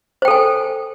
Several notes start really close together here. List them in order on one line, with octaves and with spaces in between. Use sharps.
C5 G5 A4 G#5